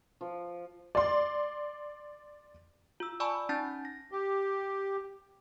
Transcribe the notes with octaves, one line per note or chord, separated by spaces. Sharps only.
F3
D5 C6
F4 E6
D5 G#5 A5 B5 C#6 E6
C#4 D#4 A5 G6 A6
A#6
G4